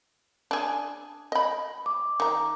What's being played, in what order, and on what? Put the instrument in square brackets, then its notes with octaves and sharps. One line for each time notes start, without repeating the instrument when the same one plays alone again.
[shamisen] D4 G#4
D#5 B5
[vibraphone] D6
[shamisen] D#3 A#5